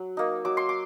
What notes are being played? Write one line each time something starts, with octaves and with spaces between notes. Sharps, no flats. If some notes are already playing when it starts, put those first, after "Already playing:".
Already playing: F#3
A#3 D#4
F#3 D6
C6
D6